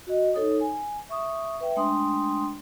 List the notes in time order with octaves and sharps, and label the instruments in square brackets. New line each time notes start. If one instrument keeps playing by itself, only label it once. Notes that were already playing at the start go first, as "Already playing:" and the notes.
[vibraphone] F#4 D#5
D#4 A4 C#5 D#6
G#5
E5 C#6 D#6
B4 E5 G5
G#3 A3 D4 G5 C6 D#6